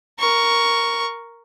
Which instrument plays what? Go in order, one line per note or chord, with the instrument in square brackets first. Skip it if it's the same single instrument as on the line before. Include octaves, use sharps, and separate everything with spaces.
[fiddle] A#4 C#6